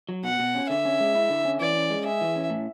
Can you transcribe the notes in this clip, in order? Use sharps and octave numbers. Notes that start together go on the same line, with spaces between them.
F#3
B2 F#5
B2
C#4
D3 E5
C#4
G#3
E4
D3
C#4
E3 D5
C#4
G#3
G#4 E5
E3
C#4
A2